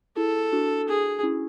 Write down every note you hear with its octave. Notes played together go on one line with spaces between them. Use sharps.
E4 G#4 A4
D4 F#4
G#4
C#4 E4